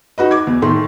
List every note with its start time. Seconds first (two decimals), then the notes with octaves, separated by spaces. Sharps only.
0.18 D#4 F#4 B4 D#5
0.31 D6 G#6
0.47 E2
0.62 A2 D#3 A3 C6